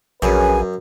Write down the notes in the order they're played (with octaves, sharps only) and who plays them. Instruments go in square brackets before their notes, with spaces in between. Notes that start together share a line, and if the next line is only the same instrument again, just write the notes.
[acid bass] A#1 [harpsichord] F#2 [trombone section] C#4 G#4 B4 [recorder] G#5